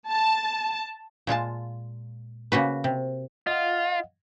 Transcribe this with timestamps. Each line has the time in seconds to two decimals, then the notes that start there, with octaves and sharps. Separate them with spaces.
0.10 A5
1.27 A#2 G#3 F4 A5
2.52 C#3 A#3 F#4 B4
2.84 C3
3.47 F4 D#5 F5 F#5